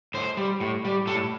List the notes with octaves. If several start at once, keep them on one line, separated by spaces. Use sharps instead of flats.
A2 C5
G3
A2
G3
A2 A4